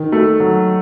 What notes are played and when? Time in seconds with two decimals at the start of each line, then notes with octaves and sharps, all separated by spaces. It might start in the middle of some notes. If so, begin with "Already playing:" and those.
Already playing: D#3
0.12 A3
0.40 F#3